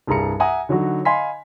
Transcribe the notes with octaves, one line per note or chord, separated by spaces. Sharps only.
C2 G2 G#4 A#5 C#7
E5 F#5 G#5 A#5 D#6
D3 F#3 D#4 F#4
D#5 F5 G#5 B5 C6 B6